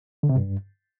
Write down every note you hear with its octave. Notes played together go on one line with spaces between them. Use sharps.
D3
C3
G2